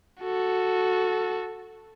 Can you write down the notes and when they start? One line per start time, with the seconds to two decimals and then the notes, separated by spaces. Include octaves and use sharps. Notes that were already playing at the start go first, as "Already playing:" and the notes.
0.21 F#4 A4